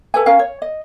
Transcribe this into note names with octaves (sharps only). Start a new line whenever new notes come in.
A4 B4 G#5
C#4 A#4 F5 G#5
C#5
D#5